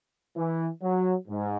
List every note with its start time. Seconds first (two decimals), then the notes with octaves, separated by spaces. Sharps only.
0.36 E3
0.81 F#3
1.28 G#2